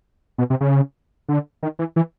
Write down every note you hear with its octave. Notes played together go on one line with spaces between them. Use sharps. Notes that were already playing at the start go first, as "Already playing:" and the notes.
B2
C3
C#3
D3
D#3
E3
E3